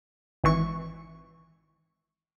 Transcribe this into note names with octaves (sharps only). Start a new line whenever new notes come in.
G#1 E3 C#6